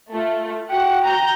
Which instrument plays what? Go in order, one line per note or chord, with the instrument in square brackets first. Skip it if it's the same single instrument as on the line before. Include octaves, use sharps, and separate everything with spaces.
[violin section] A3 [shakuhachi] F4
[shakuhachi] F#4 [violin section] F#5 [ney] G5
[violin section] A#5 G6